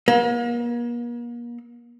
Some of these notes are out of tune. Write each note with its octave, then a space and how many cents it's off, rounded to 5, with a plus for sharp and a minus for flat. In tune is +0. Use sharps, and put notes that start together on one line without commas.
A#3 +40